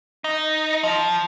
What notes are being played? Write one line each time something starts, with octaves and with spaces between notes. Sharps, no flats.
D#4
F3